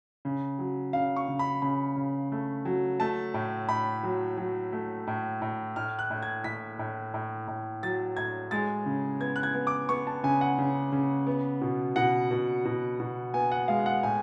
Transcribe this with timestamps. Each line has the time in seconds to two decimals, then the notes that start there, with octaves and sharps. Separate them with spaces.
0.25 C#3
0.59 F#3
0.93 C#3 F5
1.16 C#6
1.28 C#3
1.39 B5
1.62 C#3 B5
1.96 C#3
2.32 A3
2.65 F#3
3.00 A3 A5
3.34 A2
3.69 A2 B5
4.03 F#3
4.37 F#3
4.73 A3
5.07 A2
5.42 A2
5.76 A2 F6
5.99 F#6
6.11 A2
6.22 G#6
6.44 A2 B6
6.79 A2
7.14 A2
7.48 A2
7.83 F#3 A6
8.17 A2 G#6
8.51 G#3 A6
8.86 C#3
9.20 B3 G#6
9.36 F#6
9.43 G#6
9.54 B3
9.67 D6
9.89 B3 C#6
10.07 A5
10.23 C#3 G#5
10.41 F#5
10.58 C#3
10.92 C#3
11.27 B3
11.61 B2
11.96 B2 F#5
12.31 B2
12.65 B2
13.00 B2
13.34 B3 G#5
13.52 F#5
13.68 G#3 F5
13.86 F#5
14.03 A2 G#5